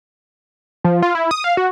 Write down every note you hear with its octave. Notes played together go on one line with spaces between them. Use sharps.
F3
F4
E4
D#6
F5
F#4